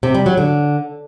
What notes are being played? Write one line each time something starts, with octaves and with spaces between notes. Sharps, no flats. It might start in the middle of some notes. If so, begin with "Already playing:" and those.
C3
G3
F#3
D3